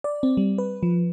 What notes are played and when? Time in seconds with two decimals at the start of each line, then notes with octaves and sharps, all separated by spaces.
0.04 D5
0.23 C4
0.37 G3
0.58 B4
0.83 F3